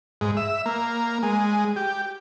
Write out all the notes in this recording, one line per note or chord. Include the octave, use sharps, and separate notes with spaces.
G#2
E5
A#3
G#3
G4